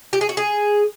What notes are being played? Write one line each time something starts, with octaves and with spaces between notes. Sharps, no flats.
G4
G#4
F#4
G#4